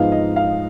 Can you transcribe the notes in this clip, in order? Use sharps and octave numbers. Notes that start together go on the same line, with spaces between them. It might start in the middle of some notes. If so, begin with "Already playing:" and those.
Already playing: G#2 F3 B3 D#4 F5
D#5
F5